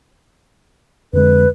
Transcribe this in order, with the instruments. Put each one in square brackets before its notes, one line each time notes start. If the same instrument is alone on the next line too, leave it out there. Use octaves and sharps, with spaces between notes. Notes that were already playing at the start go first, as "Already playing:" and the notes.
[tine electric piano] F2 D3 G#3 [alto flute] B4